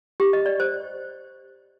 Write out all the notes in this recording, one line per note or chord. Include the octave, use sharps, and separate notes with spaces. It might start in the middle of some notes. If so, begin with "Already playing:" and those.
G4
D#5
D5
C5